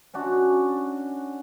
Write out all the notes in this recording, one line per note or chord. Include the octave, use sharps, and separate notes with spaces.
C#4 D4 F#4